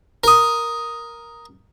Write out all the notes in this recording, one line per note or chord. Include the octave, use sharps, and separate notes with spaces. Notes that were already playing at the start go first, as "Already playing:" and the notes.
A#4 D#6